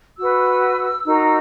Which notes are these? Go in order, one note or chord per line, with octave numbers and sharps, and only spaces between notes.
F#4 B4 E6
D#4 F#4 A#4